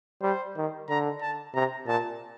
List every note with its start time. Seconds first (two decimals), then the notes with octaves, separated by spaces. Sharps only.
0.22 G3 C5
0.56 D#3
0.89 D3 A#5
1.21 A5
1.54 C3 A#5
1.87 A#2 A5